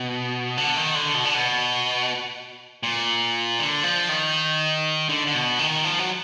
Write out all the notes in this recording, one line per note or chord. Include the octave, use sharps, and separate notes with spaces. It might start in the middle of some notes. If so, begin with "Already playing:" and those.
Already playing: B2
D3
D#3
D3
B2
D3
B2
A#2
D3
F3
D#3
D3
D3
B2
D#3
F3
F#3